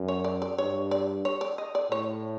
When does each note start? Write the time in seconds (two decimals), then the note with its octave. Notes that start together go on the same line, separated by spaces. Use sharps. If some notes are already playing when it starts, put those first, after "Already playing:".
Already playing: F#2
0.08 C#5
0.24 D5
0.42 D5
0.58 G2 C#5
0.91 D5
1.25 C#5
1.41 D5
1.58 D#5
1.75 D5
1.91 A2 C#5